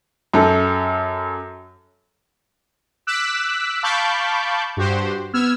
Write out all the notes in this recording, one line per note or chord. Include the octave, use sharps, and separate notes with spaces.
F#2 A4
D6 E6 F#6 B6
F5 A5 B5 C#6 D6 G6
G2 F#4 G4 C5
B3 E6 F6 G#6